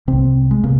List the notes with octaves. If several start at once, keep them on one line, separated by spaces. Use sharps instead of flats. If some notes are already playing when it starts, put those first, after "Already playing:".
C2 C3 C4
G#3
C3 A#3